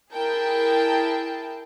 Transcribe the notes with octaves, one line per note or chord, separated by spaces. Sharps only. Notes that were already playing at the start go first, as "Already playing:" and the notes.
E4 G#4 A#4 G5 A5